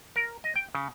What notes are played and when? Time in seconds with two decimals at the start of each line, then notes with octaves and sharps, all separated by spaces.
0.16 A#4
0.44 D#5
0.56 G5
0.75 C#3